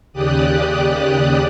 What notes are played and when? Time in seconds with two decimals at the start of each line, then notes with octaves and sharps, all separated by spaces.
0.13 D#2 C#3 G4 D5 D#6 F#6